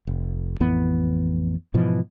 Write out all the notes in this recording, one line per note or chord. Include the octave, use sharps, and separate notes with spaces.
F1
A1 F2 E3 B3
G#2 B2 E3 F3